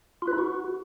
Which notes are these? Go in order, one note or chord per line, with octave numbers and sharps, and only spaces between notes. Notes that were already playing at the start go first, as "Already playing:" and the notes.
F4
B4
E4
F#4